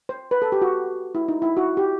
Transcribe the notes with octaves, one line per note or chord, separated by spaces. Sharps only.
C5
B4
A4
G4
F#4
E4
D#4
E4
F#4
G4